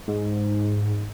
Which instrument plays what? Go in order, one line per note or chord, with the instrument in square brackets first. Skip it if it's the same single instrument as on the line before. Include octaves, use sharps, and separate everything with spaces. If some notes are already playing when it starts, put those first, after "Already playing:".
[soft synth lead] G#2